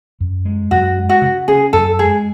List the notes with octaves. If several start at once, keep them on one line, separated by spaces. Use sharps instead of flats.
F#2
G#3
F#2 F#4
G#3
F#4
C#3
C#4 G#4
F#2 A4
G#3 G#4